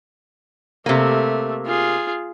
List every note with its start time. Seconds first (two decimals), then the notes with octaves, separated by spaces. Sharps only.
0.86 C3 A3 A#3
1.66 F4 G#4